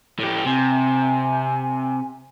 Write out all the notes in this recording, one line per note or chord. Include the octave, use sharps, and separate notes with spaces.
A2 G4
C3 G#5